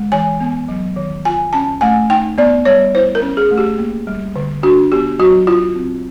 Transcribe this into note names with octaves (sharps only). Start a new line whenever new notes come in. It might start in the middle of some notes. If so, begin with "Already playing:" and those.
Already playing: G#3
E3 G#5
B3
F#3
D#3
F4 G#5
C#4 A5
A3 G#5
D#4 G5
B3 D5
G3 C#5
E4 C5
A#4
C#4
G#4
A3
G4
A#3
G3
D3
D4 F#4
B3 G4
F#3 F#4
E4 F4
C4